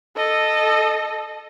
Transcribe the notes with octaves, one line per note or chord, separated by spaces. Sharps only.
A4 D#5